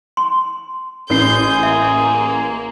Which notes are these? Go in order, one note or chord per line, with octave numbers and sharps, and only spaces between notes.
C6
A1 G#4 G6 C7
A#3 E5